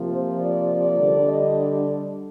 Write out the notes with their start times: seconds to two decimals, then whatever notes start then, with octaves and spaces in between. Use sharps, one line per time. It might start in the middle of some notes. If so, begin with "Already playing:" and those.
Already playing: C3 F3 A#3
0.12 C5
0.40 D5
0.70 D5
0.98 D3 G3 D4
1.27 D#5